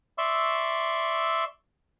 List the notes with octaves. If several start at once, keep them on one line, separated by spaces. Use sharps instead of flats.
D5 E5 C6 C#6 E6